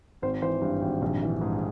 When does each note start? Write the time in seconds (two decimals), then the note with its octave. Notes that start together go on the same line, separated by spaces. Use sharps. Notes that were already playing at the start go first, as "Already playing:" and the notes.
0.22 G#1 C5
0.42 E3 C5
0.62 G2
0.82 G#1
1.02 A#1
1.22 E3
1.41 G#2 G#4